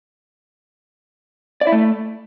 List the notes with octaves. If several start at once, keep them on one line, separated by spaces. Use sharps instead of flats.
D5
E4
A3